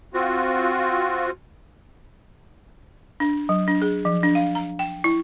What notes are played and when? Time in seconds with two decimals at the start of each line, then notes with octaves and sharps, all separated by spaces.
0.14 C4 F4 F#4
3.20 D4
3.49 F#3
3.68 D4
3.82 G#4
4.05 F3
4.23 D4
4.35 F5
4.55 A#5
4.79 G5
5.04 E4